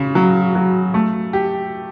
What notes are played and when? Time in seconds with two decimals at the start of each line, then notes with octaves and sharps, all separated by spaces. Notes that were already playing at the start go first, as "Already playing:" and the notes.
Already playing: C#3
0.15 F#3
0.55 F#3
0.94 A3
1.33 G4